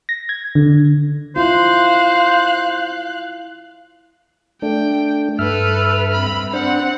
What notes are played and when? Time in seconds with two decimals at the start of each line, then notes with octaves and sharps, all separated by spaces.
0.09 A#6
0.29 G#6
0.55 D3
1.36 E4 F4 C5 F5 F#6
4.62 A3 D4 G5
5.39 G2 A4 B4 E5 F6
6.13 C4 B5
6.53 C4 D4 C5 F#5